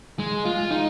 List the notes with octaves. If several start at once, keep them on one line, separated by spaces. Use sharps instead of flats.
G#3
F4
D#4